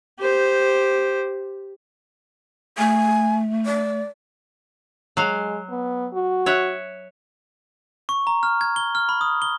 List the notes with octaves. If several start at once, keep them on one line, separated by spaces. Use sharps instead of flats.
G4 C5
A3 G#5
D5
F#3 G#3 F5
B3
F#4
C#5 E5 F#5
C#6
A#5
F6
G#6
G7
F6
B5
D#6
G7